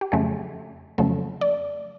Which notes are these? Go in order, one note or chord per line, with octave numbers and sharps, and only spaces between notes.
G4
F2 C#3 F#3 A3 G#4
F2 C#3 F#3 A3 A4
D5